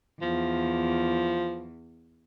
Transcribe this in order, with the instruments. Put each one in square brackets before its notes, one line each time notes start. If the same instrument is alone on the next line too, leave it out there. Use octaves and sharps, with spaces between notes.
[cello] E2 [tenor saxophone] F3